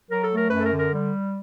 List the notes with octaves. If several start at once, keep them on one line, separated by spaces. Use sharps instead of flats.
F#3 A#4
A4
A3
A#4
F#2 B4
A4
A#4
D3
A#4
G3